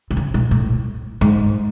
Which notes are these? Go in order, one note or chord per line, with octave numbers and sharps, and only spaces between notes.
B2
C#3
B2
A2
G#2